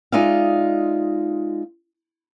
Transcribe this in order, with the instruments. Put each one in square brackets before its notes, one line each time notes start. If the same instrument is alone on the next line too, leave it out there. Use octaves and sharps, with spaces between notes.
[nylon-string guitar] G#3 D#4 F4 D5 E5 F5